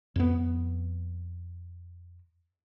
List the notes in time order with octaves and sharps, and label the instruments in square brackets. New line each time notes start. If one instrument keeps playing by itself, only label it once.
[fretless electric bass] F2 B3